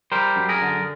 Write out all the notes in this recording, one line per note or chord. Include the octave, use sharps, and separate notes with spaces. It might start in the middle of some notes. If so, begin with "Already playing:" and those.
G3 A#4 C5
F#2
G#4 A#4
D3